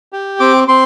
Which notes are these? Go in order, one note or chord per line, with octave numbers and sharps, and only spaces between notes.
G4
C4 D6
C4 C6